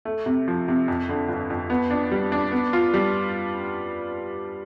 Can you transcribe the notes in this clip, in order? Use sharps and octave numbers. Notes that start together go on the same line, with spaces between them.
A3
C3
F3
C3
F2
D3
G1
F2
B3
D4
G3
D4
B3
F4
G3